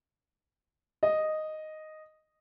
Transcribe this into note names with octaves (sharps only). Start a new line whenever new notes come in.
D#5